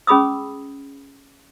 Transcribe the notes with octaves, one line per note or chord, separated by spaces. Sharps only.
C#4 G#4 B5 D#6 E6